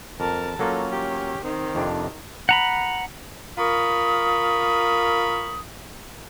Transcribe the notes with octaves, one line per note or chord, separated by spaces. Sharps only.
F2 A#4 A5
F#3 A#3 C#4 F4 A4
G4
D#3 C4 D#4
F2 C3 D4
F#5 A#5 B5
F4 A#4 A#5 B5 C#6 D#6